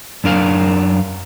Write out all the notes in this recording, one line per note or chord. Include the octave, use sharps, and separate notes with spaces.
F#2 D4 A#4 F5